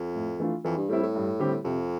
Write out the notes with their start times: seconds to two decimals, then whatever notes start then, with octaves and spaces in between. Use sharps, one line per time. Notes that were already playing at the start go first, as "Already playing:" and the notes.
Already playing: F2
0.15 A2
0.40 E3 A3 D4 F4
0.65 F2 E3
0.77 G2
0.89 A2 G3 C4 E4
1.02 A2
1.15 G2
1.39 D3 G3 C4 G4
1.65 F2 C3